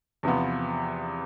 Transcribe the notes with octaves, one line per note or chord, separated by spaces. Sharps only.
E2 C3 F3 B3